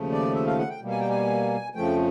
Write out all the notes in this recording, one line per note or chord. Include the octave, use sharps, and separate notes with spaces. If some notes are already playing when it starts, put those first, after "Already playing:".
Already playing: D#2 C#3 F3 A3
D5
E5
F5
F#5
G5
B2 G3 A#3
G#5
G5
G#5
F2 C#3 F3 A3 G5